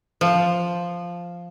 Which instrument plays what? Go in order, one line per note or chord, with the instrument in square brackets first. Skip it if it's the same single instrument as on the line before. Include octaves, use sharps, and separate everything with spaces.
[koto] F3